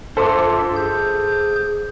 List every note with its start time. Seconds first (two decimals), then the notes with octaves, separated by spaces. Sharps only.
0.17 G2 F4 A4 C5 D#5 E5 C6 D6
0.76 G#4 G6